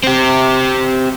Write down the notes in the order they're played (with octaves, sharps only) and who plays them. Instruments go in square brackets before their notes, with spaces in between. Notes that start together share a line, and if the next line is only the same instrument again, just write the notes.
[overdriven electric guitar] C4 G4